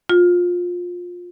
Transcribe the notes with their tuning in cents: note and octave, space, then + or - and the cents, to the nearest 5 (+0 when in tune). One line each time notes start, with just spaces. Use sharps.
F4 +20